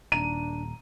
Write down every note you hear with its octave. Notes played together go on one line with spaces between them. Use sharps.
D#1 D4 A#5 D#7